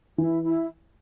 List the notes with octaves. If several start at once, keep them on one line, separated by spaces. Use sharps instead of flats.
E3 E4
E4